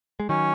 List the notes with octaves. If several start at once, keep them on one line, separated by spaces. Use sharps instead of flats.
G#3
D#3 F#3 C#4